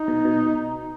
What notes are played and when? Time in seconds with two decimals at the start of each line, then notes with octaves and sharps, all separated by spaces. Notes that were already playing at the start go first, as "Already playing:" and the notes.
Already playing: D#4
0.08 B2
0.25 B2